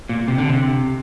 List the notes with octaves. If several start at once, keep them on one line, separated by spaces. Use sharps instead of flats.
A#2
C3
D3
C3